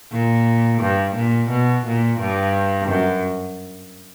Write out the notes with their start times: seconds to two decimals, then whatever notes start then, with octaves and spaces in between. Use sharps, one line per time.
0.12 A#2
0.82 G2
1.16 A#2
1.50 B2
1.86 A#2
2.20 G2
2.89 F#2